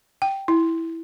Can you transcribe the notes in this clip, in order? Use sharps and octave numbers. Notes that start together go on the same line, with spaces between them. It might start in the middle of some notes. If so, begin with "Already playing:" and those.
G5
E4